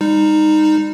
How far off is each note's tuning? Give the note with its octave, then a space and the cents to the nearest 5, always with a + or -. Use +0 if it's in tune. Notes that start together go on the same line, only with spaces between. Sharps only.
G3 +35 D#4 -5